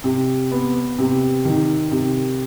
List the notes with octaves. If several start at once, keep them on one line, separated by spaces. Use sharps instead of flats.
C3
B3
C3
D#3
C3